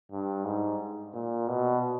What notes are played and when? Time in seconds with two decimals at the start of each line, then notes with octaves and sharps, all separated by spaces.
0.12 G2
0.45 G#2
1.14 A#2
1.48 B2